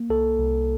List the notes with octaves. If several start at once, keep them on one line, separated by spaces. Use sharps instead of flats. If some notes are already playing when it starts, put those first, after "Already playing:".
Already playing: A#3
C2 A4
C2